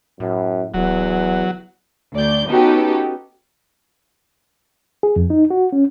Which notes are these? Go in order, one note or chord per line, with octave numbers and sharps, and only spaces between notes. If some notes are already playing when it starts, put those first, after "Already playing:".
F#2 A2
D1 E2 F#3
D2 D5 G6
B3 C#4 D#4 F#4 G4 A4
G#4
F2
D#4
F#4
C#4